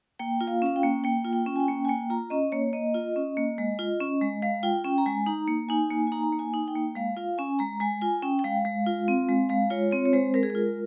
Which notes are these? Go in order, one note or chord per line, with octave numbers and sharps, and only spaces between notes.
A#3 G5
F4
F5
C#4 F5
G5
A#3
A#3 G5
F4
G5
C#4
G#5
G5
A#3
G#5
A#3 G5
F4 A#5
C#4 D#5
A#3 C#5
A#3 D#5
F4
C#4
A#3
G#3
F4
C#4
G#3
G#3 F5
F4 G5
C#4 G5
A#5
G#3 G#5
D#4 A#5
A#3
D#4 G#5
A#3
G#5
D#4 A#5
A#3
G#5
D#4
G5
A#3
G#3 F5
F4 F5
C#4 G#5
G#3 A#5
G#3 G#5
F4 G#5
C#4 G5
G5
G#3 F5
G#3
F4
C4
G#3
G#3 F5
F4 C#5
C4 C#5
C#5
G#3 C5
G#3 A#4
G#4
F4 A#4